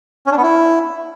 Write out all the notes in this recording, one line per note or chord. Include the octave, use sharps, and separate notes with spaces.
C#4
D4
B3
E4